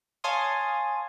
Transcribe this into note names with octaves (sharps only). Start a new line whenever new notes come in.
C#5 F5 G#5 A5 C6 D#6